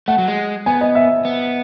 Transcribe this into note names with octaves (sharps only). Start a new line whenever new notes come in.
A3 F#5
F#3
G#3
B3 G#5
D#5
E5
B3